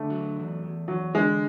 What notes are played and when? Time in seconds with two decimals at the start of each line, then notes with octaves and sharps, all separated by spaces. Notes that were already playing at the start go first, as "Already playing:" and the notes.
Already playing: D3 A3
0.10 F#3
0.36 E2
0.63 E2
0.88 E2 F#3
1.14 D3 G#3